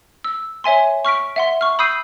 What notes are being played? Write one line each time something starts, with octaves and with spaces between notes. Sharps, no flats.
E6
C#5 E5 G#5 C6
C#6 F6 B6 D7
E5 F#5 C6
C#6 F6
B5 D#6 E6 G6 C7 D#7